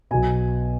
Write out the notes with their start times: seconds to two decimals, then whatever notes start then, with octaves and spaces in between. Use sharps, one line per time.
0.11 B1 B2 G#5